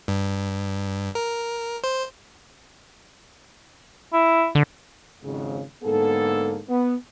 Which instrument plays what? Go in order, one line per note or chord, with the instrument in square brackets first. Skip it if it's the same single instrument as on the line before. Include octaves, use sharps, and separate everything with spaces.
[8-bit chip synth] G2
A#4
C5
[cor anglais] E4
[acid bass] D3
[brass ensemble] G#1 F2 G#2 C#3
G#2 D3 A#3 B3 G#4 A4
B3